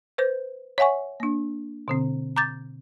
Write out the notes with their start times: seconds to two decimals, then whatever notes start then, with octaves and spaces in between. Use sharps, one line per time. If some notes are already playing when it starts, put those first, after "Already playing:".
0.18 B4 C5 G6
0.78 C#5 E5 F#5 G#5 C#6
1.20 A#3 D4
1.88 B2 D3 C4
2.36 A#5 D6 G6 A6